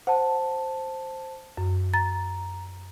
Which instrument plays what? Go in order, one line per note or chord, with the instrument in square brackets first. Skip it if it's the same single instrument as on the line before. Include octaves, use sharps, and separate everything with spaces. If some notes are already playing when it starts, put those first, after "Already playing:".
[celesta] C5 A5 [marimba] F#5
[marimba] F#2
[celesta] A#5 [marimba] A6